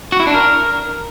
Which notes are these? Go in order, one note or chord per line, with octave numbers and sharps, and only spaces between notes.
F#4
E4
D4
A#4